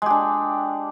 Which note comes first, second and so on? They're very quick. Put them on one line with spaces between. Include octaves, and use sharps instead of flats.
G#3 G4 D4